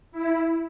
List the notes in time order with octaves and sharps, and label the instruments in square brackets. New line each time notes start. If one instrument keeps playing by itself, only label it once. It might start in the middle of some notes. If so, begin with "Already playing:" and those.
[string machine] E4